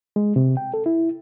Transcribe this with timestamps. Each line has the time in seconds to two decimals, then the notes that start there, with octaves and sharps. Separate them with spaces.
0.16 G#3
0.36 C3
0.57 G5
0.74 A4
0.86 E4